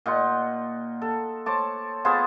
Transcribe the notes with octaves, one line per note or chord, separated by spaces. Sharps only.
A#2 D#4 F#5 C6
A4
C5 C#5 A5 D6
B3 F4 G#4 C5